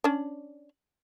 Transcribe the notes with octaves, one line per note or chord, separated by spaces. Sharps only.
C#4 D4